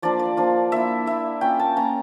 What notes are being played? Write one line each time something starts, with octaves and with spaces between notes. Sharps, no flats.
F3 A#3 D4 F4 D5
D5
F3 A#3 D4 F4
A#3 E4 E5
A#3 E4 E5
A#3 C#4 F4 G5
A5
A#3 C#4 F4 A#5